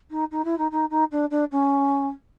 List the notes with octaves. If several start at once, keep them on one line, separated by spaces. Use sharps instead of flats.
D#4
D#4
E4
D#4
D#4
D#4
D4
D4
C#4